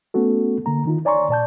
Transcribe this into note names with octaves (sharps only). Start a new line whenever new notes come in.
A3 B3 C#4 F#4 A4
D3 A#3 A#5
D#3 D#4 F4
C#5 D5 G#5 A#5 C6 C#6
A#2 D5 A5 G6